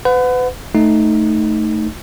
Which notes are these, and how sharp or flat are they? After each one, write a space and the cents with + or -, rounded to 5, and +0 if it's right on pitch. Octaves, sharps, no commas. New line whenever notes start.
B4 +35 F#5 -20
A3 +0 D#4 +0